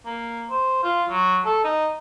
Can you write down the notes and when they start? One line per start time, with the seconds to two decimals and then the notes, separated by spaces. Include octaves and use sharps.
0.06 A#3
0.50 C5
0.83 F4
1.09 F#3
1.45 A4
1.64 D#4